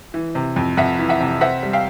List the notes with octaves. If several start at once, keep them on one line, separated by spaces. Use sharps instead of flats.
E3
C3
F2
F2 E5 F#5
E3
E5 F#5
C3
C4 E5 F#5
G3
F5 G5